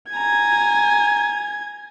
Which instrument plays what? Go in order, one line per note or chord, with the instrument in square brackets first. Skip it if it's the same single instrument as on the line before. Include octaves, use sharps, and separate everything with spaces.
[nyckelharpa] G#5 A#5 [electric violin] G#6